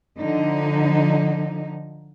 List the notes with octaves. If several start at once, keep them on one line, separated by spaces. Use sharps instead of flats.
D3 F3 D#4